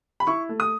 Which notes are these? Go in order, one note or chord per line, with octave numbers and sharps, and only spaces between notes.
B5
E4 C#6
A3
D#6